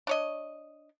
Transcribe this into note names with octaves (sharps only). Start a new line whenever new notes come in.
D4 C#5 D#5